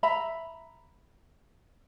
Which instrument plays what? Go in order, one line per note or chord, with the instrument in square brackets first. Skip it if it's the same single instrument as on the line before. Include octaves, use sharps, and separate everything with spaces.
[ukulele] E5 A#5 B5